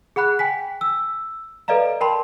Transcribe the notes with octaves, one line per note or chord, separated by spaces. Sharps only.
G#4 F#5 B5 F#6
G5 G#5 B6
E6
A4 B4 D5 D#5 F5 A#5
A#4 G5 A5 B5 C6